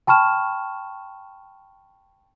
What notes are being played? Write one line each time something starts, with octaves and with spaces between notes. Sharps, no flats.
G5 A5 B5 C#6 F6 E7